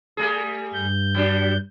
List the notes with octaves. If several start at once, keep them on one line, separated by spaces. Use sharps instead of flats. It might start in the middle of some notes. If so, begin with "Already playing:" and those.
G3 A3 G#4
G2 G6
F#3 G3 D4